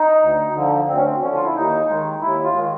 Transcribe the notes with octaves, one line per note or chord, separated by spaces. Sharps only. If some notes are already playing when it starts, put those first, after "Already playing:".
Already playing: D#4
D2
D3 F3
D2 C4
C#4
C4
D3 F3 C#4
F4
E4
D#2 D#4
D#3 G#3
D#2 E4
F4
D#3 G#3